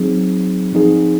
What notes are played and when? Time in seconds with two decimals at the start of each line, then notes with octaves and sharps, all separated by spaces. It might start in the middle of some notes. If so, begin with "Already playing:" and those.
Already playing: F#3 C4 D#4 G#4
0.73 F3 C4 D#4 G#4